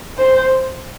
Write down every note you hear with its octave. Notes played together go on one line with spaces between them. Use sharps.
C5